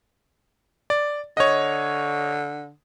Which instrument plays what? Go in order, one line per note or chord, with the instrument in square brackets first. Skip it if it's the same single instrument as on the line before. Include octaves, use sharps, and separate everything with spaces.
[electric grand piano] D5
[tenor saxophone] D3 [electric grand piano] C#5 D#5